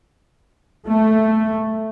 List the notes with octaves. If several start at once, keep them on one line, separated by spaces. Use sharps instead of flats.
A3